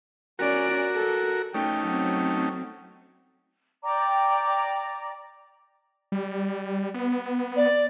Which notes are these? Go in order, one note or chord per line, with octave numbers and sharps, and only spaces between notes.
C#4 F#4 A#4 D5
A4
A3 C#4 D#4 G5
F#3 C4
D5 G5 A#5 D6
G3
B3
D5